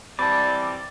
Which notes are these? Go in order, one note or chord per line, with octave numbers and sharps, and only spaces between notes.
E3 G3 C4 D5 A5 B5